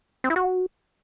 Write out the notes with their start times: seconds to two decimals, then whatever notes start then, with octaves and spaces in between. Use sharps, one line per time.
0.24 C4
0.30 E4
0.36 F#4